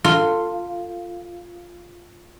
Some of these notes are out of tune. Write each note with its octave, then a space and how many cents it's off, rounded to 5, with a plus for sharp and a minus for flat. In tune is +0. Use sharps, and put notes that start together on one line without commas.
F4 +0 A4 +25